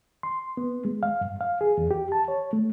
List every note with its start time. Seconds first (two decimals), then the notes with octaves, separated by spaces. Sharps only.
0.23 C6
0.57 B3
0.85 G#3
1.03 F5
1.21 G2
1.41 F5
1.61 G#4
1.78 E2
1.91 G4
2.12 A5
2.28 C#5
2.53 A3